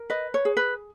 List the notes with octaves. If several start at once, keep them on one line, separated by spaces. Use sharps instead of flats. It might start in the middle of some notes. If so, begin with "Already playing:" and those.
Already playing: A#4
B4 D#5
C#5
G#4
B4